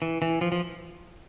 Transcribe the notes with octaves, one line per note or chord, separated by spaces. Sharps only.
E3
E3
F3
F3